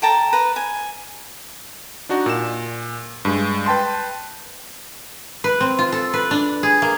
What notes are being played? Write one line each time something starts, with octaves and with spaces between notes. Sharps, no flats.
A4 G5 A5 A#5
B4 A#5
G#5
D4 D#4 F#4
A#2 E7
G2 G#3
B4 G5 A5 C6
B4
C4
F4
A4
B4
D4
G#4
A#3